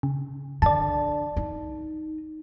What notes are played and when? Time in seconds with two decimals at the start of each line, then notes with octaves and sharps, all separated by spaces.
0.03 C#3
0.62 D3 D5 A5
1.36 D#4